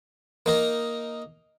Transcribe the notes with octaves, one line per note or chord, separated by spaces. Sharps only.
A#3 D#4 A#4